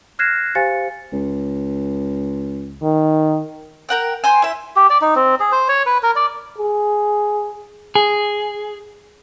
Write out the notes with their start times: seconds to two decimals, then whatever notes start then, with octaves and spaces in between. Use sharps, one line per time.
0.19 F6 F#6 G#6 A#6 C7 E7
0.55 G4 C5 F5 G#5 A6 C#7
1.12 C#2
2.83 D#3
3.89 A#4 F#5 G5
4.24 C5 G5 G#5
4.42 E4 E5
4.76 G4
4.90 D5
5.01 D#4
5.16 C4
5.40 G#4
5.52 C5
5.69 C#5
5.86 B4
6.03 A#4
6.16 D5
6.59 G#4
7.95 G#4